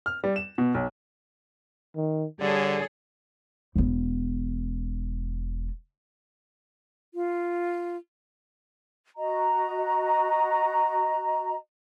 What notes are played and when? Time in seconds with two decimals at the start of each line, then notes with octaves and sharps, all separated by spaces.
0.06 F6
0.24 G3
0.36 E7
0.58 B2
0.74 B1
1.96 D#3
2.41 D3 G3 G#4 A4 C#5
3.76 E1 B3
7.14 F4
9.17 F#4 D#5 A#5